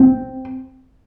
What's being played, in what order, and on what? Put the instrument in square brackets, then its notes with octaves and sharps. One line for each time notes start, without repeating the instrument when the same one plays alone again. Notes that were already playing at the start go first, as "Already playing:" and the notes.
Already playing: [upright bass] C4